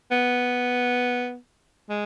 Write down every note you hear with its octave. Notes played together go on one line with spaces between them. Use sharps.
B3
G#3